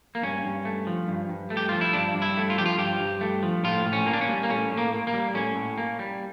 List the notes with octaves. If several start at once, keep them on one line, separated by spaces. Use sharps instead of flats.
A#3
G2 C#4
G2
A3
F3
G2
G2
A3
G4
F3 F4
E4
G2 D4
G2
E4
A3
F4
F3 G4
F4
G2 G4
G2
A3
F3
A2 F4
A2
C#4
A#3
D4
C#4
G3
A#3
A2 C#4
A2
A#3
A#3
A#3
G3
A2 C#4
A2
A#3
G3